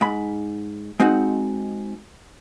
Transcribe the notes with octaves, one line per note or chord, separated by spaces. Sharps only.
G#2 B5
G#3 C4 D#4 F#4 F#5